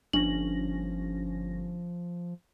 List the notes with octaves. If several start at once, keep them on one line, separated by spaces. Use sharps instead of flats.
G1 F3 C#4 D4 A#6 F#7